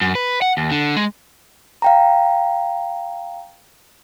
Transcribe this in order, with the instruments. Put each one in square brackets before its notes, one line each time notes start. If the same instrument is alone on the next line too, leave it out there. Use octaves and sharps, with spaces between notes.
[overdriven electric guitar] F#2
B4
F#5
D#2
D3
G#3
[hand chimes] F5 G5 A#5